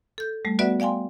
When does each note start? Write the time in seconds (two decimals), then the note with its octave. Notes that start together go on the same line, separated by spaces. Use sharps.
0.18 A4 G6
0.45 G3 A3
0.59 B3 F#4 B4 D5 E5 F#5
0.80 D5 F5 G5 G#5 C6